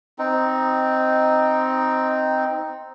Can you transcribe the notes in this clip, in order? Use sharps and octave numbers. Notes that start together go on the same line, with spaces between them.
C4 D#4